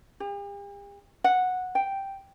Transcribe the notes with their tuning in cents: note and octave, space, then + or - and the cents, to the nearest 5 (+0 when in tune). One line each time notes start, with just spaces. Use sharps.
G4 +45
F#5 -10
G5 -5